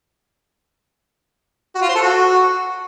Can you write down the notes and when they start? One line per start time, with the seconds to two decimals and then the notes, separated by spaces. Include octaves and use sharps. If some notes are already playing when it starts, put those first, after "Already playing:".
1.75 F#4
1.82 F4
1.88 C5
1.95 A4
2.02 F#4